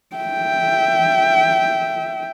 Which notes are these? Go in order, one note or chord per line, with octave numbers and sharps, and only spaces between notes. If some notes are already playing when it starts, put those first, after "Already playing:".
E5 G5